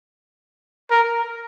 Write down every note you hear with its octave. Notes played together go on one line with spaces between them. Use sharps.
A#4